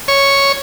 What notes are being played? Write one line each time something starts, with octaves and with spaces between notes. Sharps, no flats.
C#5